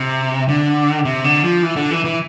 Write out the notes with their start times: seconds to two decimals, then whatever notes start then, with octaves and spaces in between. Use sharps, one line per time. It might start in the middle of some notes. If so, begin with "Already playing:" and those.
Already playing: C3
0.48 D3
1.05 C3
1.24 D3
1.43 F3
1.63 E3
1.76 D3
1.91 E3
2.05 E3